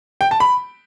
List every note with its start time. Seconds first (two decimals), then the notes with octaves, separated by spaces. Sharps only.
0.21 G5
0.31 A5
0.40 B5